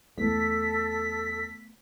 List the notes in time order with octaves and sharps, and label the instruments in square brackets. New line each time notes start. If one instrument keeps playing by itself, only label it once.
[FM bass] E2 [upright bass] A3 B3 [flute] A4 [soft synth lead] B6